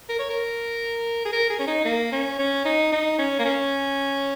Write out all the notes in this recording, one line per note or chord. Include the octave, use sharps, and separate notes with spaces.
A#4
C#5
A#4
G#4
A#4
G#4
C#4
D#4
A#3
C#4
C#4
D#4
D#4
C#4
A#3
C#4